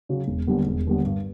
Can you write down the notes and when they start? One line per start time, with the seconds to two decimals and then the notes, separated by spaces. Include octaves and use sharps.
0.09 C#3 F#3
0.28 E1
0.47 D#2 D3 G3 B3
0.67 E1
0.87 D#2 D3 G3 B3
1.05 G2